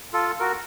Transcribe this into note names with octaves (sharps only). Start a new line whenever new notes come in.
F4 A4
F#4 A#4